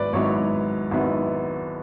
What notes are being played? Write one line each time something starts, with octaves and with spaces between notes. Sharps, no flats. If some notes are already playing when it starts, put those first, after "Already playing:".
Already playing: G#1 G#2 F#3 B3 E4 B4 D5
G#1 G#2 F#3 B3 E4 C#5
G#1 G#2 F#3 B3 E4